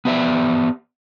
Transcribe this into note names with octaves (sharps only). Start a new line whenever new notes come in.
B3 G4 D5 E5